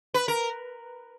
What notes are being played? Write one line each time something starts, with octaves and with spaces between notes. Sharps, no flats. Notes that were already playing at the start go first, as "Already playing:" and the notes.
B4
A#4